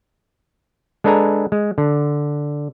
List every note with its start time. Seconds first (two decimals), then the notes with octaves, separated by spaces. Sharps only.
1.04 G#3 D4 A4 B4 G#5 A#5
1.52 G#3
1.78 D3